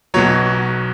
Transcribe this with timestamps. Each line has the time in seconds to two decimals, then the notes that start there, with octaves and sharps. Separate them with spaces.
0.14 B1 B2 F#3 C#5